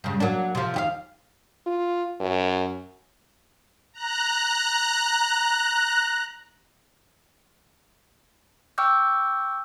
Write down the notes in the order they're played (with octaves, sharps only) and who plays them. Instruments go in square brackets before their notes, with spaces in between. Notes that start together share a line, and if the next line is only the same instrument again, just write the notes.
[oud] G2 C#3
F#3 A#3 D4
C3 F3
D#2 G4 F5
[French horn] F4
F#2
[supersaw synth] A#5 F#6
[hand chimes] G5 C#6 D6 E6 F6 G6